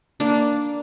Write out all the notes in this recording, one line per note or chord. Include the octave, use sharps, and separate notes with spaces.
A#3 D4